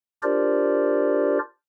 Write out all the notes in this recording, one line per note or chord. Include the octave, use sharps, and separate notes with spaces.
D4 F4 G4 A#4 C5 D5